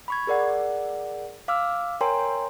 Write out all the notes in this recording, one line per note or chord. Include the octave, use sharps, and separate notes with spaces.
B5 C#6 G#6
G#4 A#4 D5 F#5
F5 D6 E6 F6
A#4 C#5 G5 G#5 A#5 C6